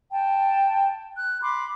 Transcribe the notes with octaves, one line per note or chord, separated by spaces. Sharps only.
G5 A5
F#6
B5 C6 D6